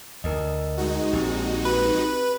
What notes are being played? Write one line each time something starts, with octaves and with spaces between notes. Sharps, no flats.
D2 A#4 D#5
G#3 D#4 F#4
A#1 C4 G4
B4